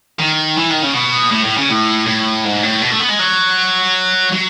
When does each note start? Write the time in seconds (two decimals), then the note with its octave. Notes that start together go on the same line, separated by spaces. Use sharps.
0.19 D#3
0.57 E3
0.70 D#3
0.82 C#3
0.94 B2
1.31 A2
1.44 A2
1.57 C#3
1.70 A2
2.06 A2
2.45 G#2
2.63 A2
2.82 B2
2.92 A3
3.00 B3
3.09 G#3
3.20 F#3
4.32 F#3